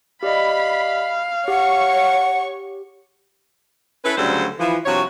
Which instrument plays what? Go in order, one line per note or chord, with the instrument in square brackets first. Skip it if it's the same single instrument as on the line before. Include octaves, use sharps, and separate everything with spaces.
[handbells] G4 D5 D#5 [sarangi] F5 [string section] B5
[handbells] G4 [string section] C#5 C#6 [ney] F#5
[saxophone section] C#4 E4 A4 B4
D2 C#3 F#3 G3 A4 C5
E3 F3
G2 C3 F3 F#4 C#5